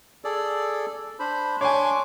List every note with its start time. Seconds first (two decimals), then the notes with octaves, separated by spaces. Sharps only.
0.24 G#4 A4 D5
1.19 D4 C5 B5
1.61 D4 C#5 G#5 C6 D6